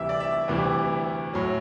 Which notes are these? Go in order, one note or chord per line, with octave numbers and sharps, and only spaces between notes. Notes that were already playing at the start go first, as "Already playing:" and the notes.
Already playing: D2 C3 E3 G3 E5
D5
E5
D2 C3 E3 G3
A2 F#3